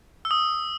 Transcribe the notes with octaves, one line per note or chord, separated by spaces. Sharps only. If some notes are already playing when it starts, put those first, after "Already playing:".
E6
D#6